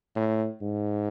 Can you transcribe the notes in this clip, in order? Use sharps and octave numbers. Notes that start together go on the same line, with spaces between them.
A2
G#2